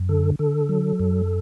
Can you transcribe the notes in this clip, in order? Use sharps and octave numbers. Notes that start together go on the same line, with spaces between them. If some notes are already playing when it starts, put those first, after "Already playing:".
Already playing: F#2
D3 A4
D3 A4
F#3
F#2